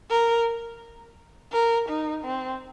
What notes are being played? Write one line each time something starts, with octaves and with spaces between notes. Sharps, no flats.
A#4
A#4
D#4
C4